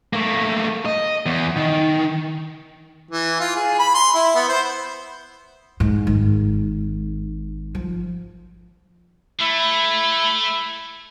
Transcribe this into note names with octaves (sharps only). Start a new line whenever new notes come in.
A3 A#3
D#5
E2
D#3
E3
F4
G#4
B5
C6
E4
B3
C5
G#2
G#1
F3
A3 E4